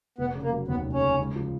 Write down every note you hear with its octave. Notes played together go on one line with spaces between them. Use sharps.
F1 B3
C#3
A#3
F#3
D#2 B3
F1
C#4
C#3
C#2
F3